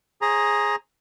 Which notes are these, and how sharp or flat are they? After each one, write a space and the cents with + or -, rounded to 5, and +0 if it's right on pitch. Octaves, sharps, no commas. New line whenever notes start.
G#4 +0 C5 +45 A#5 +10